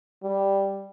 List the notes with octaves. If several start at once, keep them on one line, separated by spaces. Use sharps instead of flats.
G3